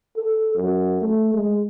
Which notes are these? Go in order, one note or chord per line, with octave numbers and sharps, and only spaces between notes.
A4
F#2
A3
G#3